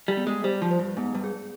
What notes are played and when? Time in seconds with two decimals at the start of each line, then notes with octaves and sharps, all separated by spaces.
0.08 G3
0.17 B3
0.27 G#3
0.44 G3 C5
0.62 F3
0.71 C5
0.79 G2
0.97 G#2 B3
1.15 G2
1.24 G#4